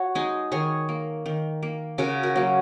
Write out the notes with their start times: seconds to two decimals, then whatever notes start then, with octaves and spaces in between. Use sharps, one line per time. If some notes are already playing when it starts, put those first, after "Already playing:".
Already playing: F#4 C#5
0.15 G#3 D#4 G#4
0.52 D#3 G#4 C#5
0.89 A#3
1.26 D#3
1.63 A#3
1.98 C#3 F#4 A#4
2.23 F#4 A#4
2.36 F#3 A#3